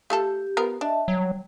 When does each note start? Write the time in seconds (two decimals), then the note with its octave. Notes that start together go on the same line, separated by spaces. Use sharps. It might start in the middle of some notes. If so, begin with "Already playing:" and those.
0.10 A3 F4 G4 A4
0.57 B3 F4 A#4
0.81 D4 D#5 E5 A5
1.08 F#3 G3